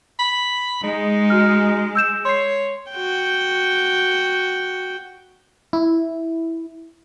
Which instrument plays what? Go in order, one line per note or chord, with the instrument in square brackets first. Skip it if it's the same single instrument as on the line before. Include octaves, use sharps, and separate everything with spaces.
[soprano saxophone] B5
[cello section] G#3 [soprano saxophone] D#4
[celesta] F#4 F6
E6 G6 E7
[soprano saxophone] C#5 [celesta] C6 C7
[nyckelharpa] F#4 G5
[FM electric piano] E4